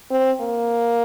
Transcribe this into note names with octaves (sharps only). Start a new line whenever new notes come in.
C4
A#3